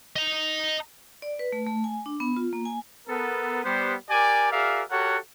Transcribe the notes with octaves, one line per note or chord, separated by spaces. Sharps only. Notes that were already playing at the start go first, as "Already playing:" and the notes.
D#5 A#5
D5
B4
A3
A3
G#5
D4
B3
F4
A#3
G#5
B3 A4 A#4
G3 B3 C5
G4 A#4 D5 G#5
F#4 G#4 A#4 D5 E5 F5
F#4 G4 A4 A#4 C#5 F#5